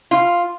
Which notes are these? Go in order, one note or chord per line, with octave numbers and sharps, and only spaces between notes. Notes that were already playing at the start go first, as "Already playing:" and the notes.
F4